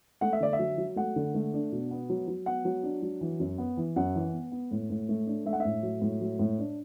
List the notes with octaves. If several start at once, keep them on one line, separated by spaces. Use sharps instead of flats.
A3 F#5
E5
D3 D5
E5
F#3
F#3
A3 F#5
D3
A3
D4
B2
B3
F#3
F#3
B3 F#5
F#3
D4
F#3
E3
F#2
B3
E3
F#2 F#5
E3
B3
B3
A2
A2
A3
D4
A3 E5
F#5
E5
A2
F#3
A2
F#3
A2
D4